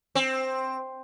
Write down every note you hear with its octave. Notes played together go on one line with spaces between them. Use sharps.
C4